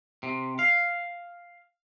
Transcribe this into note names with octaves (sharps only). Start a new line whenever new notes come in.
C3
F5